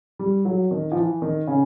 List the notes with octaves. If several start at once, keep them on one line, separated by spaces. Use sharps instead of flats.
G3
F#3
D#3
F3
E3
D#3
C#3